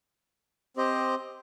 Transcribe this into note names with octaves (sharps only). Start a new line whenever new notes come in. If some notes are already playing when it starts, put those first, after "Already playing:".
C4 G4 C5 D#5